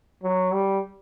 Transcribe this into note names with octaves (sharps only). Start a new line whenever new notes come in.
F#3
G3